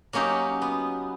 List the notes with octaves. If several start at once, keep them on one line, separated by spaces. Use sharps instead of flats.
F#3 A#3 C#4 D#4 G4
B3